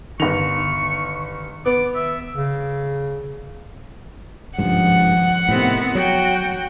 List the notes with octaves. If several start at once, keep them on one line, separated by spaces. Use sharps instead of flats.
G1 D#3 C#6 F7
B3 D6
E5
C#3
G#1 C#2 G2 F3 F#5
A2 C3 D#3 B3 C4
F#3 F#4 G5